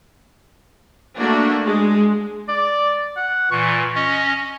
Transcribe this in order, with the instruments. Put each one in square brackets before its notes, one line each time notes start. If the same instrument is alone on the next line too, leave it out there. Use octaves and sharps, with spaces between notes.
[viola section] A3 A#3 D4 F#4
G#3
[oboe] D5
F#5
[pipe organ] A#2 E3 [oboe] C#6
[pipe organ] C#4 D#5 [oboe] C#6